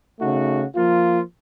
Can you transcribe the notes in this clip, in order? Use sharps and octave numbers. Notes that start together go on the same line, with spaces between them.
C#3 A3 D#4 F#4
F3 A#3 F4